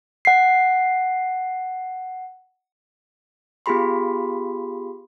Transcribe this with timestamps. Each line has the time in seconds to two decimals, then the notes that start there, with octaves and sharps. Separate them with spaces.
0.25 F#5 C7
3.66 B3 F4 G4 G#4 B5 C6